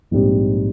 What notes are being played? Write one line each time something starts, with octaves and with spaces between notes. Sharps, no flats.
A#1 G#2 G3 C4 G4